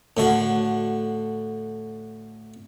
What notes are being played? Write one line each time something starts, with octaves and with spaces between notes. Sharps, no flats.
A2 D3 F#4